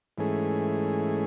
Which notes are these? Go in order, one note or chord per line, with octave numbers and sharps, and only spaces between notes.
G#2 E3 A3 C#4 G#4